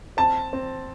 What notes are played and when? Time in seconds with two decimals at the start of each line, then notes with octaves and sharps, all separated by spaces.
0.17 C4 A5
0.53 C4